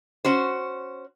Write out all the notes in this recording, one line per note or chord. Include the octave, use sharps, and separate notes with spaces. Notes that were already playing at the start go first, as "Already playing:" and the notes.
C#4 F#4 C5